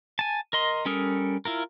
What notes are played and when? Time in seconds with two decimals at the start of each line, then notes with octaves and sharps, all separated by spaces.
0.19 G#5 A5
0.53 A#4 D#5 C6
0.85 G3 C#4 A4 A#4 D#6
1.45 E4 F4 A#4